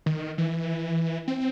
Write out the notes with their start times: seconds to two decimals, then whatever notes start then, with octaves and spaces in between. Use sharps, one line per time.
0.06 D#3
0.38 E3
1.28 C4